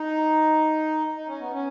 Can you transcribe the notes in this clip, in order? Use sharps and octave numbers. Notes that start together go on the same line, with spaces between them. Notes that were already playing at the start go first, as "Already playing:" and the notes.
Already playing: D#4
D#4
C#4
B3
C#4